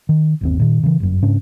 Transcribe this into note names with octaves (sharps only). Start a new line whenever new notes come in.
D#3
G1 D#2 C4
A#2 D#3
C#3 E3
G1 F#2
G#2 C#3 C#4 D4